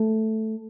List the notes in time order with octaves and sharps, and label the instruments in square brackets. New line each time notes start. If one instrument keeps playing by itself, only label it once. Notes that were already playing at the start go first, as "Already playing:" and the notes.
Already playing: [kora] A3